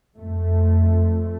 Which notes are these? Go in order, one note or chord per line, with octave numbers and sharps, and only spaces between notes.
F2 A3